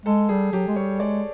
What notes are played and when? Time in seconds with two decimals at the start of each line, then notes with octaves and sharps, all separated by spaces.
0.06 G#3 A4
0.29 G3 G#4
0.53 F#3 G4
0.68 G#3
0.76 G3 C#5
1.00 G#3 D5